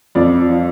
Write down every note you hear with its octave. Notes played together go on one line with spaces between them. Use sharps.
F2 D5
F3